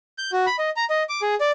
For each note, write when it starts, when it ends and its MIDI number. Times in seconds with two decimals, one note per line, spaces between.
0.18 0.31 91
0.33 0.46 66
0.47 0.56 83
0.59 0.70 75
0.76 0.85 82
0.90 1.03 75
1.09 1.21 86
1.22 1.35 68
1.41 1.51 74